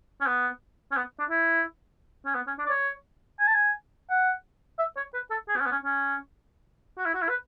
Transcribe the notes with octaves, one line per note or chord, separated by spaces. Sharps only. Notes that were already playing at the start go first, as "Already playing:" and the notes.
C#4
B3
C#4
B3
D4
E4
C#4
B3
C#4
D4
D5
C#5
G#5
A5
G#5
F#5
E5
C#5
B4
A4
G#4
B3
C#4
B3
C#4
C#4
F#4
E4
F#4
E4
B4